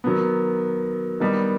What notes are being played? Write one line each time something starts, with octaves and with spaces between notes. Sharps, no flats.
D#3 F#3 B3
D#3 G3 B3 D#4